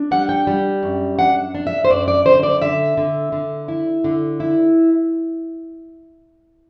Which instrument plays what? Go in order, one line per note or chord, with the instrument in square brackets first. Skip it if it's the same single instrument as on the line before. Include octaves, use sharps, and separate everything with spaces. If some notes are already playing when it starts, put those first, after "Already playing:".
Already playing: [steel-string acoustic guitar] D4
G3 F#5
G5
G3
F#2
D4 F#5
D4
E5
C5
F#2 D5
D5
D3 C5
D5
D3 E5
D3
D3
E4
D3
E4